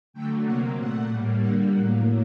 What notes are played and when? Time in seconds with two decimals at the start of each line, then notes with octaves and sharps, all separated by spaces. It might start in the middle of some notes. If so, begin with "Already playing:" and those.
0.13 D3 F#3 A3 G5
0.45 C3 F#3 A#3 F#5
0.76 A#2 A3 F#5
1.07 A2 G3 A#3
1.38 D3 G3 A#3 F#5
1.70 A2 F#3 A#3 F#5